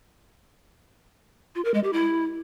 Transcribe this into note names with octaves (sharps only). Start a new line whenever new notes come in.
F4
A#4
G#3
G4
E4